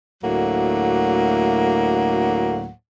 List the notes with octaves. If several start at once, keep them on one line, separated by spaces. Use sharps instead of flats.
D2 A2 F#3 A#3 F#5